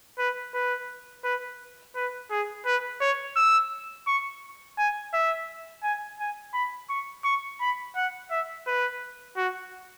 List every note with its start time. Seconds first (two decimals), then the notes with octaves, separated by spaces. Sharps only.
0.19 B4
0.54 B4
1.24 B4
1.96 B4
2.31 G#4
2.66 B4
3.01 C#5
3.36 E6
4.07 C#6
4.78 G#5
5.14 E5
5.83 G#5
6.20 G#5
6.54 B5
6.89 C#6
7.24 C#6
7.61 B5
7.96 F#5
8.31 E5
8.67 B4
9.37 F#4